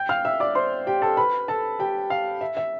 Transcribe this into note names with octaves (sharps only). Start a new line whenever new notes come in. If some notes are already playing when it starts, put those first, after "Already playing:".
Already playing: G5 G6
F5 F6
E5 E6
D5 D6
C5 C6
G4 G5
A4 A5
B4 B5
A4 A5
G4 G5
F5
E5
E5